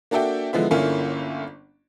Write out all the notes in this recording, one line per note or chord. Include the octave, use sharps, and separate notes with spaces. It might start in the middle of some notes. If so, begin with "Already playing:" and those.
A#3 D4 F#4 A4 E5 G5
D3 F3 G#3 B3 E4
G1 D3 A#3 C#4 E4 F4